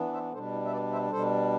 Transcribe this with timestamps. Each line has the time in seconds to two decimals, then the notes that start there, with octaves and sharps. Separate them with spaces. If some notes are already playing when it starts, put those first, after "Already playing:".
Already playing: E3 B3 D4
0.13 C5 E5
0.32 B2 G3 D4 A4 C5
0.52 E4
0.65 E5
0.72 B4 D5
0.92 C5 E5
1.11 B2 G3 D4 A4 C5